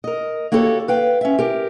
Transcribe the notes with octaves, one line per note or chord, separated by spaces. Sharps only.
A#4 D#5
A#3 F#4 G4 A4 A#4 C#5
B4 F5 G5
C#4 E5
G4 A#4